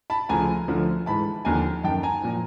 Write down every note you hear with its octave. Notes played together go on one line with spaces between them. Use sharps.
A5 B5
D2 C#3 F3 G#5 A#5
D2 D3 F3
G#2 E3 A5 B5
D#2 D3 F3 G#5 A#5
F#2 D#3 G5 A5
G#5 A#5
A#2 F3